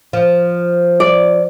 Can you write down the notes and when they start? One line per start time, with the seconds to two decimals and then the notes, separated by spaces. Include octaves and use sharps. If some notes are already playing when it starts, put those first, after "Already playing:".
0.13 F3
1.00 D5